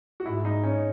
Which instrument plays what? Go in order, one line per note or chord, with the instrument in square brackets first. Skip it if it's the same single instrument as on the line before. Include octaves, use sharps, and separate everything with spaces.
[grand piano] F#4
[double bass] G#2 [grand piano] E4
[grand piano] D#4
C#4